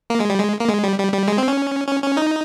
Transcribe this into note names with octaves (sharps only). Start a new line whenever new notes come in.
A#3
G#3
G3
G#3
A#3
G#3
G3
G3
G3
G#3
C4
C#4
C#4
C#4
D#4